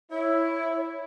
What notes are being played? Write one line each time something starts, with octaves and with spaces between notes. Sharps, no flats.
E4 C#5